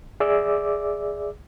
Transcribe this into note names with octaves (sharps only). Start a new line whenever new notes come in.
G#4 D5 E5 D6 E6